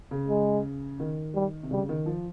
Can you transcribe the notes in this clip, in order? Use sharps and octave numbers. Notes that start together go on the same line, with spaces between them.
C#3
G#3
D#3
G3
C3
C#3 G3
D#3
F3